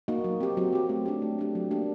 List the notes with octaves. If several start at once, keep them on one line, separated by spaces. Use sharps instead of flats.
A#3 D#4 F#4
F#3
C4 G4
F#3
C4 G4
A3
D4 G4
A3
D4 G4
F#3
A#3 D4 G4